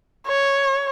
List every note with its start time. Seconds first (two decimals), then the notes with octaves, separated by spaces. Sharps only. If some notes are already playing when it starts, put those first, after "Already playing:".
0.27 C#5